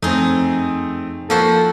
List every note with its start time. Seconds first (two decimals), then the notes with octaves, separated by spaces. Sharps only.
0.02 F2 A3 C4 D#4 G#4
1.30 F3 A#3 F#4 A4 C5